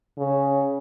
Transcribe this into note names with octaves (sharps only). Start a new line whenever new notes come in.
C#3